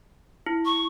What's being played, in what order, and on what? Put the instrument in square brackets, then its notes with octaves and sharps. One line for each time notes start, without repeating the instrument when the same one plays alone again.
[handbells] E4
[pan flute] C#6